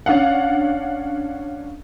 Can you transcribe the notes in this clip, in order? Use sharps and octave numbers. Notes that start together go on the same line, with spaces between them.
C#4 D4 F5 F#5